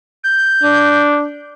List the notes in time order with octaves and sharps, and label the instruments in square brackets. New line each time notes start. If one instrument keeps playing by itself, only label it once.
[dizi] G6
[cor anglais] D4